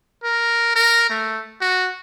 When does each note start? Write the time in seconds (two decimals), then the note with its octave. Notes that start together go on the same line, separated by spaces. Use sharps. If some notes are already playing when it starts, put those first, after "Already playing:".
0.24 A#4
0.76 A#4
1.10 A3
1.61 F#4